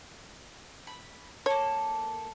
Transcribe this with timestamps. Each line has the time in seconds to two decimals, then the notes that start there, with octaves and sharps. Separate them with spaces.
0.87 B5
1.46 A#3 A4 C#5